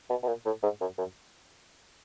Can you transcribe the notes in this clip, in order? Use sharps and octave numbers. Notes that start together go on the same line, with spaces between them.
B2
B2
A#2
A2
G#2
F#2
F#2